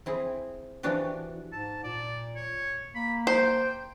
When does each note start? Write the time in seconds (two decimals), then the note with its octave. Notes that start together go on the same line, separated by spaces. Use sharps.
0.06 C4 E4 G#4
0.83 E3 F3 D4 F#4 G4
1.53 G#2 A5
1.84 A#2 D5
2.36 C#5
2.95 A#3 B5
3.27 C5 G5